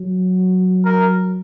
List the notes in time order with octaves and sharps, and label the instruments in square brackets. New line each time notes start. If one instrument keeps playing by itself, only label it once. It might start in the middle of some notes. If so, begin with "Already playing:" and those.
Already playing: [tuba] F#3
[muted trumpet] A#4